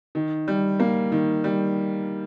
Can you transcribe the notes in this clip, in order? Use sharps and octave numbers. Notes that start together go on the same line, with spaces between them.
D#3
G3
A#3
D#3
G3